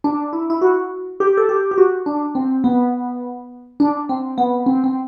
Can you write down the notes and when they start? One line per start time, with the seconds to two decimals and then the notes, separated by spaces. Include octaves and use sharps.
0.04 D4
0.33 E4
0.50 E4
0.61 F#4
1.20 G4
1.37 A4
1.49 G4
1.71 G4
1.78 F#4
2.06 D4
2.35 C4
2.64 B3
3.80 D4
4.09 C4
4.38 B3
4.66 C4
4.84 C4